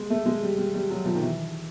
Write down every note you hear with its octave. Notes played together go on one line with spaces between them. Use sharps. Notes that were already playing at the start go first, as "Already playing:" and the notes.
Already playing: G#3
A3
G#3
G3
G3
G3
F#3
F3
D#3
E3